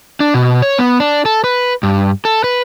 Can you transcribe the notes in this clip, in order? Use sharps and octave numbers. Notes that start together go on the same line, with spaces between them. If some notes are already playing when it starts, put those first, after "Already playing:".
D4
B2
C#5
B3
D4
A4
B4
G2
A4
B4